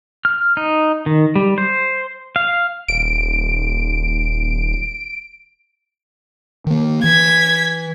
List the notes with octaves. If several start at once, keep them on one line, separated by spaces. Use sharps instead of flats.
F6
D#4
D#3
G3
C5
F5
D#1 D7
D#3 A#3
E3 G#6 B6